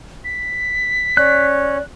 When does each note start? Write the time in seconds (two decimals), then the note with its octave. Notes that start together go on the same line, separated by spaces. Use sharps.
0.24 B6
1.17 C#4 D5 F#6